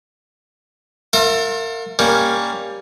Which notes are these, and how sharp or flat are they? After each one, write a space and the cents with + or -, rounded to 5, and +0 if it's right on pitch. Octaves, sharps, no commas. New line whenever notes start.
F4 +40 A#4 -30 E5 +15
G3 +15 A#3 +0 C#4 +5